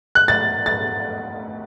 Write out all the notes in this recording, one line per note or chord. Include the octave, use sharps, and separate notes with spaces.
F#6
A6
A6